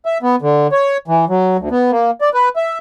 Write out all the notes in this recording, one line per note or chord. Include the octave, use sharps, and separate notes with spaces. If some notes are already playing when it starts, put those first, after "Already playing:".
E5
B3
D3
C#5
E3
F#3
D2
B3
A#3
D5
B4
E5